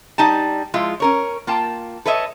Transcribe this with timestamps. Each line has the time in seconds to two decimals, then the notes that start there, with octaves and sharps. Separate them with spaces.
0.18 G3 D#4 G#5 A5
0.74 F3 G#3 E4 F4
1.00 C#4 A#4 C#5
1.47 A#3 F4 G5 A5
2.06 A4 B4 C#5 D#5 E5